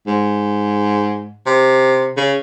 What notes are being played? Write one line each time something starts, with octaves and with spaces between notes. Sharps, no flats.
G#2
C3
C#3